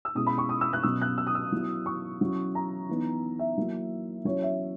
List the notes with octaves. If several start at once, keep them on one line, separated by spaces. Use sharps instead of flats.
E6
B2 G#3 C#4 E4 D#6
B5
C#6
D#6
E6
F#6
B2 F#3 C#4 E6
F#6
E6
D#6
E6
F#3 B3 E4
C#6
F#3 C#4 E4
A#5
E3 B3 D#4
E5
F#3 A#3 E4
F#3 C#4 E4 C#5
E5